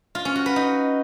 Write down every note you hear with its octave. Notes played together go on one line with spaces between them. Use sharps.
F4
C#4
F#4
B4
D#4